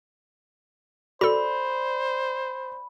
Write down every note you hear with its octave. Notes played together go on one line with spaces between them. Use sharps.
F#4 A4 C5 D5 B5